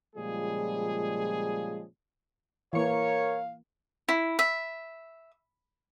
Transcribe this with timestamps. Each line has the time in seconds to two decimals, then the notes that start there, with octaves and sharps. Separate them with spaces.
0.16 A#2 C#3 F3 G3 G#3 G#4
2.73 E3 A#3 A#4 C#5 F5
4.08 E4
4.39 E5